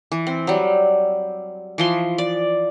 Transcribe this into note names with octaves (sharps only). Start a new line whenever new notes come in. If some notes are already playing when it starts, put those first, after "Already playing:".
E3
C4
F#3 G3
E3 F3 C6
D5